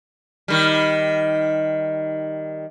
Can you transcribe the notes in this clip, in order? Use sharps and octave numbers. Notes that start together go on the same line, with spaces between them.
D#3 G3